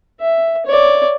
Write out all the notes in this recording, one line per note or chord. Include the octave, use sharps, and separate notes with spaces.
E5
C#5 D5